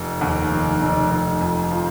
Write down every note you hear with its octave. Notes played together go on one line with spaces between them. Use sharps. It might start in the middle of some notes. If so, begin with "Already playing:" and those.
Already playing: F1
D#2
F1
F1
F1
F2
F3